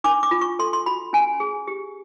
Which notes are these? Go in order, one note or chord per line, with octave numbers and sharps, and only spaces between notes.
D4 D6
D6
F4
C#6
A4 C6
C6
F#4 B5
C#4 G#5
G#4
G4